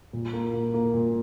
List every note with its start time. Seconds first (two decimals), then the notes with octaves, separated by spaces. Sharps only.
0.13 A#2
0.33 A#3
0.53 A#3
0.74 A#3
0.94 A#2